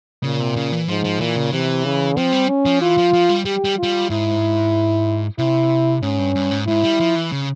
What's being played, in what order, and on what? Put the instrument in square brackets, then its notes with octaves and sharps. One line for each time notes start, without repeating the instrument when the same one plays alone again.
[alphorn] A#2 [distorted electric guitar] C#3
[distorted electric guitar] C3
C#3
E3
[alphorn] G#2 [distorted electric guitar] F3
[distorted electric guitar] F3
[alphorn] A#2 [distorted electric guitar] E3
[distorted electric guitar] C#3
[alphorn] C3 [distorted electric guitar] E3
[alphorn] C#3
[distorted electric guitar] F3 [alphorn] C4
[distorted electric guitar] G3
[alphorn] C#4
[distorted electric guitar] F3
[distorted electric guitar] E3 [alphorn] F4
[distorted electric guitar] F3
F3
G3
[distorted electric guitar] G3 [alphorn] G4
[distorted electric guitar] G3
[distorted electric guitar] G3 [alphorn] F4
[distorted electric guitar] G#2 [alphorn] E4
[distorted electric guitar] C3 [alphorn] E4
[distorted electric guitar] G#2 [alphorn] C#4
[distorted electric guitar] G2
G2
G#2
[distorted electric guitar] G#2 [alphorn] E4
[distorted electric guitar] G3
F3
E3
C#3